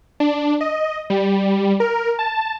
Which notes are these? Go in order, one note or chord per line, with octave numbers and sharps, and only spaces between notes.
D4
D#5
G3
A#4
A5